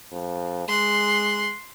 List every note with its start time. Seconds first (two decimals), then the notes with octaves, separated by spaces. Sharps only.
0.12 F2
0.68 G#3 C6 F#6